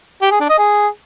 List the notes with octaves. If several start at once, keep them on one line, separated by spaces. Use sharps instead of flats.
G4
G#4
D4
D#5
G#4